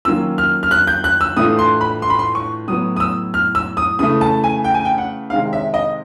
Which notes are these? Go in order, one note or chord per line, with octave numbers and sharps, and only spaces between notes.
D#3 F#3 A#3 C#4 F4 E6
F6
F6
F#6
G6
F#6
E6
A2 E3 A3 D4 F4 D#6
C6
B5
C6
B5
C6
C#6
A2 F#3 B3 D#6
D#6
E6
F6
E6
D#6
C#3 E3 A3 D#6
A5
G#5
G5
G#5
G5
F#5
C3 D#3 G#3 F5
E5
D#5